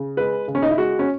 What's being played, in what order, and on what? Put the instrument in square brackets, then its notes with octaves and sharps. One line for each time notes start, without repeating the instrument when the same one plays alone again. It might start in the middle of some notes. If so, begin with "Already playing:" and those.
Already playing: [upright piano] C#3
G#3 B4
C#3
C#4
D#4
E4
G#3 F#4
C#4